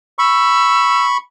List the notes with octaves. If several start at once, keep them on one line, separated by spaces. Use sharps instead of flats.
B5 C#6 E6